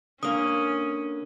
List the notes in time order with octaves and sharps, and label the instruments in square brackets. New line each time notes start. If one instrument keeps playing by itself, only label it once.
[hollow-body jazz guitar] D3 A#3 [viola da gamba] C#4 [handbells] D#6